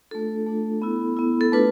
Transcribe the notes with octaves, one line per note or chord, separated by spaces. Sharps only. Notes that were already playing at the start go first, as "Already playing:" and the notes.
A3 D4 F4 A4
A3 D4 F4
B3 E4
B3 E4
A4
A3 D4 F4 B4